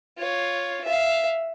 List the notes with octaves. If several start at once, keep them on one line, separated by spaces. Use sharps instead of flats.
F4 C#5
E5 F5